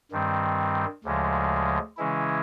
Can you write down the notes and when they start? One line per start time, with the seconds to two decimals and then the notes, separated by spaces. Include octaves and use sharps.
0.12 G2 D#3 G3 C4
1.04 D2 C#3 F3 G#3
1.97 C#3 E3 G#3 C#4 E4